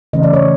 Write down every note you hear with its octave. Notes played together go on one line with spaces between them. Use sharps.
C#3 E3 A3 C#4 D#5
D5
C#5